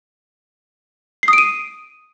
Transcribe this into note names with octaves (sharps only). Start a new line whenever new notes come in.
C7
D#6
D7
D#7